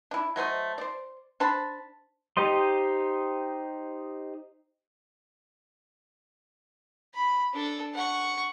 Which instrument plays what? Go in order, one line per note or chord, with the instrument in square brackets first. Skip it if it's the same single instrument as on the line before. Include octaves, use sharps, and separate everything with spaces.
[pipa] D4 E4
F#3 A3 C5 D#5
C5 D5
D4 C5 A5 B5
[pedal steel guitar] D#4 G4 C5 D#5 C6
[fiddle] B5
D4 A4
F#5 C#6